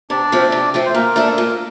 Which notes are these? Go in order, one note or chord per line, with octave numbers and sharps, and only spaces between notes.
C3 D4 D5
F3 A3 C4
C3
F3 A3 C4
C5
A#2 A#3 A#4
A3 D4 A4
A#2